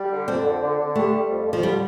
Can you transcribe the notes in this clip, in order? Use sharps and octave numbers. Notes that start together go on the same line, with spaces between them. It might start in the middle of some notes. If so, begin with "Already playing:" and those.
Already playing: G3
D3
F2 C4
D3
D3
D3
G3 A3
G3
F2
F2
F3
D3 G3